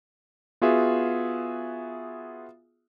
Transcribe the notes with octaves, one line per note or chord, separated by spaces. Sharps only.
B3 F4 F#4 G#4 E5